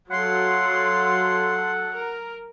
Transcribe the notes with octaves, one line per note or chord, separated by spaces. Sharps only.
F#3 A4 C#5 F5 F#5 C6
A#4